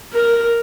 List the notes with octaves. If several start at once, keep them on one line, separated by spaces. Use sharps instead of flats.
A#4